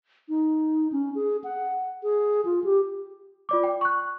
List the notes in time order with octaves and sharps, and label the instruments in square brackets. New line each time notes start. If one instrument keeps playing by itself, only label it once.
[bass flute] D#4
C#4
G#4
F#5
G#4
F4
G4
[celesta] F4 D5 D6
G5
C#6 F#6